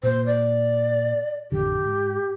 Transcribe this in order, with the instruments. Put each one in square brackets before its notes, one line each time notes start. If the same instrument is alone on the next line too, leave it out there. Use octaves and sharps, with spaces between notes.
[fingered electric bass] A#2 A#3 [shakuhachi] C5
[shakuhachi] D5
[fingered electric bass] A1 F2 D3 [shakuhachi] G4
[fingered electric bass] G#2